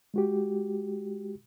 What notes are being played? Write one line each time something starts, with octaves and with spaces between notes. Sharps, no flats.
G#3 F#4 G4